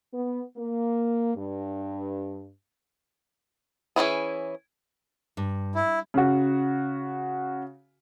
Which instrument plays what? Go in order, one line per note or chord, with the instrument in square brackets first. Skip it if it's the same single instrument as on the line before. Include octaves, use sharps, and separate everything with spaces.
[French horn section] B3
A#3
G2
[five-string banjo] E3 C#4 E4 G#4
[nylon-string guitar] G2
[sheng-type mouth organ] E4
[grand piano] C#3 F#4